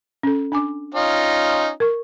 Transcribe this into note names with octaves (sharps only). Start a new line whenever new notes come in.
C#4 A4
D4 G#5 D6
C#4 D#4 F4
A#4 C#6